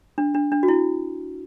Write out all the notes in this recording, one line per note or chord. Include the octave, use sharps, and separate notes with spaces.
D4
D4
D4
F#4
E4